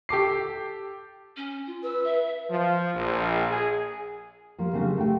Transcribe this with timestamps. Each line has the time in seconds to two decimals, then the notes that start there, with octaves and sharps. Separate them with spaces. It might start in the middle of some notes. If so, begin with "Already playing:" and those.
0.09 G4 A4 D6 C7
1.37 C#4
1.67 F4
1.83 B4 E6
2.04 E5
2.50 F3
2.95 A#1
3.50 G#4
4.58 F3 G3 A#3
4.73 C#3 F#3 G3 A#3 C4 D4
4.96 A3 G4 G5